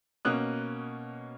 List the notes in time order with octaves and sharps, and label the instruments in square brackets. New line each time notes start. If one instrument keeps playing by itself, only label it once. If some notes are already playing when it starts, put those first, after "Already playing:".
[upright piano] B2 A#3 C#4 D#6 F#6